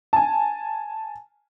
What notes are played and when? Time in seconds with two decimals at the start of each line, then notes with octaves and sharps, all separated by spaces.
0.13 G#5 A5